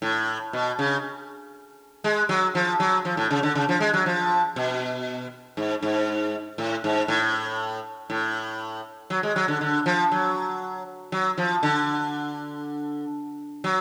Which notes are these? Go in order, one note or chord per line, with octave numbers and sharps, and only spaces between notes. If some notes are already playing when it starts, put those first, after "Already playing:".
A2
B2
C#3
G#3
F#3
F3
F#3
F3
A2
C#3
D3
C#3
F3
G#3
F#3
F3
B2
G#2
G#2
A2
G#2
A2
A2
F#3
G#3
F#3
D3
D3
F3
F#3
F#3
F3
D3
F#3